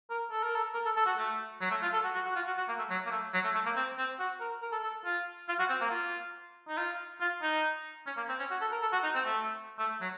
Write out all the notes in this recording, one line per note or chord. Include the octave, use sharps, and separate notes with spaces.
A#4
A4
A#4
A4
A#4
A4
A4
F#4
A3
F#3
A3
F4
A4
F#4
F#4
F#4
F4
F#4
F#4
A#3
A3
F#3
A#3
A3
F#3
A3
A3
A#3
C4
C4
F#4
A#4
A#4
A4
A4
F4
F4
F#4
C4
A#3
F4
D#4
F4
F4
D#4
C#4
A#3
C4
C#4
F#4
A4
A#4
A4
F#4
D#4
C4
A3
A3
F#3